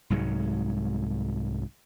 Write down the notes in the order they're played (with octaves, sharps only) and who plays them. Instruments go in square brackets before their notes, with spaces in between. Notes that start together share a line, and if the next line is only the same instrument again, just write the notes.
[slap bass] C2 G#2 F#3 G#3